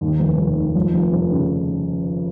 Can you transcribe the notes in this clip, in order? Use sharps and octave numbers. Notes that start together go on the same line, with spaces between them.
D#2
F1
F1
D#3
F2
F1
F1
C#3